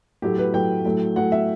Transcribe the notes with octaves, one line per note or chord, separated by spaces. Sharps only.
A2 F#3 A3 G4
B4
A2 F#3 A3 G5
A2 F#3 A3
A2 F#3 A3 F#5
E5